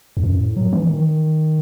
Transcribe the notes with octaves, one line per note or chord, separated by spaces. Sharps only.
E2
F#2
A2
F#3
E3
D#3